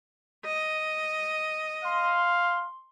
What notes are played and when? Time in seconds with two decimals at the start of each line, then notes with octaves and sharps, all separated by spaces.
0.45 D#5
1.84 F5 C6